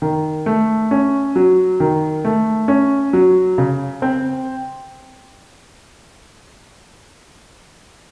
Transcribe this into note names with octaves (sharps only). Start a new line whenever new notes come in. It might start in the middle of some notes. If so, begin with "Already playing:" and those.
D#3
A3
C#4
F#3
D#3
A3
C#4
F#3
C#3
C4